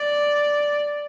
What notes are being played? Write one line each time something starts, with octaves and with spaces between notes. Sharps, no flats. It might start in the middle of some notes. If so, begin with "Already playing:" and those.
Already playing: D5